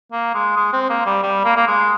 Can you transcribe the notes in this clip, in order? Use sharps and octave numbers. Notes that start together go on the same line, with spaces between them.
A#3
G#3
G#3
C4
A#3
G3
G3
A#3
A#3
G#3